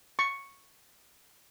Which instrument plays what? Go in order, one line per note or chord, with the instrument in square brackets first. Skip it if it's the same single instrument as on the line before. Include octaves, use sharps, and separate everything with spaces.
[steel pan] C#6